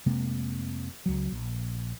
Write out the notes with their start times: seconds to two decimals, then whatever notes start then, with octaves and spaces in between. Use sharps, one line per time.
0.06 F1 C3 G#3 A#3
1.06 C#2 F#3
1.32 A#1